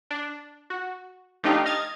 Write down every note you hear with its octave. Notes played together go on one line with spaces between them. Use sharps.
D4
F#4
F3 A3 D4 D#4 F4 G4
D#5 F6 G#6 A6